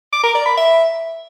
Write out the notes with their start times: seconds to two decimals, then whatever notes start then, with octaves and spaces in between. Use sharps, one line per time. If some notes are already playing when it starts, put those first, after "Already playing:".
0.12 D6
0.24 A#4
0.35 D5
0.46 B5
0.57 E5